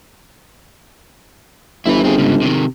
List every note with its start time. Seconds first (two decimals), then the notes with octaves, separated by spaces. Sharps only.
1.86 G1 E4 B4
2.04 C4 G#4
2.18 G#2 C#3
2.42 C3 D#3